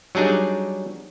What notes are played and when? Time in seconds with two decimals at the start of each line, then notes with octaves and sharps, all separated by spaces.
0.15 F#3 G3 D4 D#4 G#4